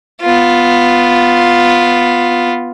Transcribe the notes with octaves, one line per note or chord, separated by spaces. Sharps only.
B3 F4